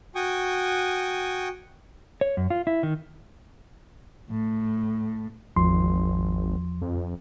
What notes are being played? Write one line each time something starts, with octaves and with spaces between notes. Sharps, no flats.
F#4 G5 G#5 C#6 D#6
C#5
F#2
F4
E4
D#3
A2
G#1 E2 F3 C6
F2